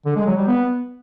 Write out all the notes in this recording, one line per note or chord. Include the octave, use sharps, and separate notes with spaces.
D3
G#3
F#3
G3
B3